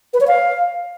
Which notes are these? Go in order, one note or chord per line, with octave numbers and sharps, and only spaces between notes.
B4
C#5
F5